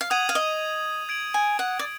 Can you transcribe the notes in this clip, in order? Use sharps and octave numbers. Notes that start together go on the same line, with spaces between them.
F5
F#5 D#6 G#6 D#7 F#7
F5
D#5
G#6 D7 F#7
G#5
F#5
D5